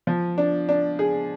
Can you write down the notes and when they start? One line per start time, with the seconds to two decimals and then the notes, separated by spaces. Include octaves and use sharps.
0.07 F3
0.38 D4
0.69 D4
0.99 G#4